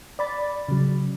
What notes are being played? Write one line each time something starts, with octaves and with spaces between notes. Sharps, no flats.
D5 B5 A6
C#3 F#3